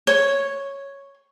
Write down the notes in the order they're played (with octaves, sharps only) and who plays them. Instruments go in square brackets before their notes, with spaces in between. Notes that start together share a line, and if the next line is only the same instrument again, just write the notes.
[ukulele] C#5